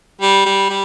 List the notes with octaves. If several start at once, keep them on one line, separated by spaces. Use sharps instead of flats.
G3
G3
G3